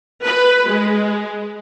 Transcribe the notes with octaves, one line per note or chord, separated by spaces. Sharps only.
B4
G#3